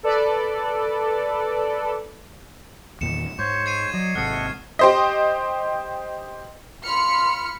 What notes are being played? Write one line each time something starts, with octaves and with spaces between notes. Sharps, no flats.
A4 B4 D5
E2 A#2 D#3 C#7 E7
G#2 C5 C#5 C#6
G#6 C7 D#7
F#3 D5 D#5
G#1 G#2 C3 A4 D#5 F#5 F6 C7
G4 C5 D#5
F4 B5 F6 C#7